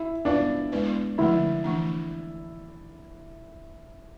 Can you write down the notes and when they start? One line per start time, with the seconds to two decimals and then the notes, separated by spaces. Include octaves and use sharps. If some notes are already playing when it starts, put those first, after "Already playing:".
Already playing: E4
0.25 B3 D4 F4 B4 F5
0.72 G#3 B3 E4 B4 D5
1.18 D3 F3 A3 E4
1.64 E3 A3 D4